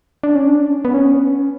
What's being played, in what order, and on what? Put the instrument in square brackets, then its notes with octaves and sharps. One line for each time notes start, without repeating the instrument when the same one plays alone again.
[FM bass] D4
C#4
D4
B3
C#4